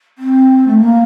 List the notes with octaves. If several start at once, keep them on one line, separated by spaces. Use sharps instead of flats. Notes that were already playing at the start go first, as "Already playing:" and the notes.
C4
A3
A#3